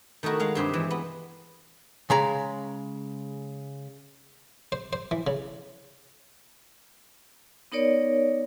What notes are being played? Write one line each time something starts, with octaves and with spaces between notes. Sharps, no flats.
D#3 A3 D#4 E4 F#4 A#4
G#3 F5 F#5
G2 C3 C4 G4 G#4 C5
E3 G#3
B3
C#3 G#3 A#5
C5
C5
E3
C#3
B3 D#4 A#4 C#5 D5